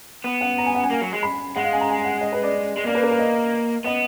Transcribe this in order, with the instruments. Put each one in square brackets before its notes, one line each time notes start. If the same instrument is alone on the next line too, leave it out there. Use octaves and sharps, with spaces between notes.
[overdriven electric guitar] B3
[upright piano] F#5
A#5
G#5
F#5
G#5
[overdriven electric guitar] A#3
F#3
G#3
[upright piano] B5
[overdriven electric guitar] G#3 [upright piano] F#5
[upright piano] F5
G#5
A#5
G#5
F#5
D#5
B4
D5
[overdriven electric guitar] G#3
[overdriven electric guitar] A#3 [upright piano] D5
[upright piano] B4
A#4
B4
D#5
[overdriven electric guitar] B3 [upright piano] D#5